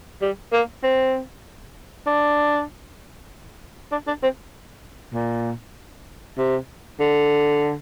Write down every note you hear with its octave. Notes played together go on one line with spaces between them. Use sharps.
G3
A#3
C4
D4
D4
D4
C4
A#2
C3
D3